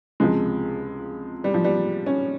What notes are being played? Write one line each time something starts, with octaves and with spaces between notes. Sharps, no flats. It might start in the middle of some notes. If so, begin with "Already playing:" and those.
C#2 C3 F3 G#3
G3
F3
G3
C#4